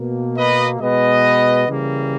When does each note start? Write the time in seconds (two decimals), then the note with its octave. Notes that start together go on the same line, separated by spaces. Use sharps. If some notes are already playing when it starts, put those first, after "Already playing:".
Already playing: B2 A#3
0.37 B4 D#5
0.80 B2 G#3 B3 B4 D#5
1.68 C#3 E3 G3 A#3